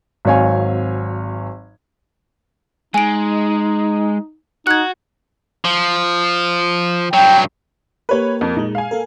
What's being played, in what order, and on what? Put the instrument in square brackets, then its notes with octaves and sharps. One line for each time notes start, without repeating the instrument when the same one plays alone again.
[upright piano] G#1 F#3 C4 C#5 F5 G#5
[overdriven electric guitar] G#3 [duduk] D#4 [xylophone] G#5 D7
[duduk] D#4 [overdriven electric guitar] F#4 [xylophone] F#6 G#6
[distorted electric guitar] F3
[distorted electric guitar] G2 F#3 [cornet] G5
[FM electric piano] A#3 G4 A#4 [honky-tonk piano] B4 C#5
[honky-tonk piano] F2
[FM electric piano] A#2 G#3 [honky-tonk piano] D#4
[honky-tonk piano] F5 G#5
[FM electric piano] A#3 A4 A#4